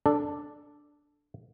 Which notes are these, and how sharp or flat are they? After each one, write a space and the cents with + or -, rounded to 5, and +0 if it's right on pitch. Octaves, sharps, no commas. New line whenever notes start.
D4 +0 A4 +0